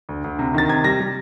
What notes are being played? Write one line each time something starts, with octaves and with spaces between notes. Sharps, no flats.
D2
D2
C3
D#3 A6
C3 G#6
G3 A#6
G3